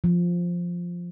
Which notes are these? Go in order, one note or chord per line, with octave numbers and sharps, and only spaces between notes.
F3